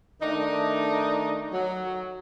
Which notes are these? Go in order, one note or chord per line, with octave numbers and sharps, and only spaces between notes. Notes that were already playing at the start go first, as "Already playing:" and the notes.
D#3 A3 D4 D#4
F#3